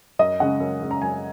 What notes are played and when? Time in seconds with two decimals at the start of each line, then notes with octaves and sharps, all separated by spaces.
0.19 F#2 D#5
0.40 C#3 G#3 C#4 F#5
0.60 F#2
0.81 C#3 G#3 C#4
0.91 A#5
1.02 F#2 G#5